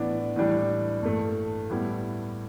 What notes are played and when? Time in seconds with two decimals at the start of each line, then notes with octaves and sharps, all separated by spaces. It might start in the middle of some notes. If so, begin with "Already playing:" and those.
Already playing: A2 E3 B3 D4
0.36 A2 E3 G3 D4
1.03 G2 E3 A3
1.70 A2 G3 B3 E4